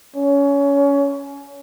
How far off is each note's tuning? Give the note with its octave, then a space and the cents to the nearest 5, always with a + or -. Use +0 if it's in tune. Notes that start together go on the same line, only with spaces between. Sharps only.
C#4 +20